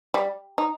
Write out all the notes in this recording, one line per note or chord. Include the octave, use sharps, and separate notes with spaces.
G3
D#4